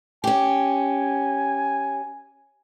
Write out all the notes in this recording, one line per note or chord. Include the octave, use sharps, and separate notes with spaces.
C#4 G4 G#5